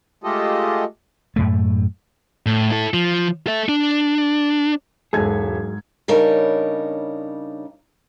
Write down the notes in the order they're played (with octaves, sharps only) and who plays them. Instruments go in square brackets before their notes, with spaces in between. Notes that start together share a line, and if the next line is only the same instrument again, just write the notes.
[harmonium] G#3 A3 F4 G4 A4 D#5
[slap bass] F#2 A2 A3
[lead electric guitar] A2
E4 A4
F3
A4 E5
D4
[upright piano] E1 A4 [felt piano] G#2 G#6 [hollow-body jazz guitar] F#3 G#3 G#4
[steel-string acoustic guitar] C#3 G3 D4 D#4 A#4 C#5